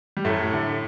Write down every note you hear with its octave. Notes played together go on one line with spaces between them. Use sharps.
G3
F#2 A2 A3
D3